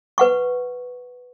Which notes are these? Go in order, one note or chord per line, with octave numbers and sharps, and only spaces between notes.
B4 F#5 C#6